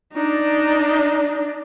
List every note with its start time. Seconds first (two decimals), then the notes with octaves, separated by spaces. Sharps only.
0.13 D4 D#4